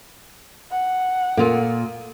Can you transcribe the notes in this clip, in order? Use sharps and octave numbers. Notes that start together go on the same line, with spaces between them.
F#5
A#2 F4 A4 A#4